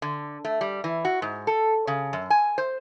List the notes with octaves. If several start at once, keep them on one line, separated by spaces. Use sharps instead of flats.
D3
A3
G3
E3
F#4
G#2
A4
C#3
F#2
G#5
C5